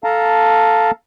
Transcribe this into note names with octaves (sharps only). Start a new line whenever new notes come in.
A4 F5 A5 A#5